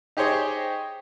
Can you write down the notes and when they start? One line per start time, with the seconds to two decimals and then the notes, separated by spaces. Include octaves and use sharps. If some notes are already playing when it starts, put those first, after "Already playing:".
0.17 D#4 G4 G#4 C5 C#5 D#5